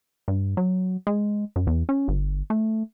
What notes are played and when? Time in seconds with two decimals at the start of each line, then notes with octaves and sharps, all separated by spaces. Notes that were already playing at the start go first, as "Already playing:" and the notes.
0.28 G2
0.57 F#3
1.07 G#3
1.56 F#2
1.67 E2
1.89 C#4
2.08 G1
2.50 A3